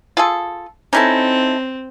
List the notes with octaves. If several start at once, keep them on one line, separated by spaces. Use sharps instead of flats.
F4 G#4 A4
C4 C#4 D#4 E4 A4